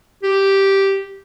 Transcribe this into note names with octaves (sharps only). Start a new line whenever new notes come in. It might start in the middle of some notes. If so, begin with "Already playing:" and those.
G4